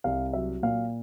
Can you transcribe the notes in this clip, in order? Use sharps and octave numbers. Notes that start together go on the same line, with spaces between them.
C2 F5
F#3 E5
A#2 F5